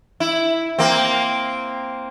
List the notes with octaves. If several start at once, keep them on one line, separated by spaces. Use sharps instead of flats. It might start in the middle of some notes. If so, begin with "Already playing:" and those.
E4
A#3 C4